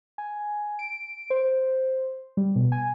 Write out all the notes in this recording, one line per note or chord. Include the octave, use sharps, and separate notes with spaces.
G#5
D7
C5
G3
B2
G#5